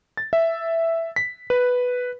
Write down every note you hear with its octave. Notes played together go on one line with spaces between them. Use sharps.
A6
E5
B6
B4